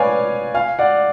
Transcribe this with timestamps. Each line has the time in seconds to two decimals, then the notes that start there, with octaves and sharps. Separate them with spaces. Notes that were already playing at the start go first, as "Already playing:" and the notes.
Already playing: B4 C#5 D5 F5 G#5
0.54 F5 G#5
0.79 D5 F#5